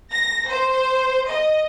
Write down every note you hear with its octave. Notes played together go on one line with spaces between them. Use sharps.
A#6
C5
D#5